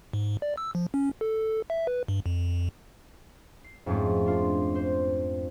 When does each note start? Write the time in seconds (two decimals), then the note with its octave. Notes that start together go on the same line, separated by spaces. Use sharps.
0.13 G#2
0.42 D5
0.57 E6
0.75 F3
0.94 C#4
1.21 A4
1.70 E5
1.87 B4
2.08 G2
2.26 F2
3.64 C7
3.86 F2 G#2 G#3 A3 C4 C#4
4.26 D4 F4
4.75 C5